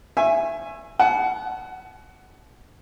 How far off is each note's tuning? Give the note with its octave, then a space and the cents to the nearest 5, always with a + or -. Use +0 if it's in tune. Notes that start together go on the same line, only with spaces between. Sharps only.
E5 +20 G#5 +0 C#6 -30
F#5 +20 A5 -40